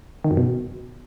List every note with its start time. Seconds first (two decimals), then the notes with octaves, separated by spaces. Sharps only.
0.24 D#3
0.31 F#2
0.37 B2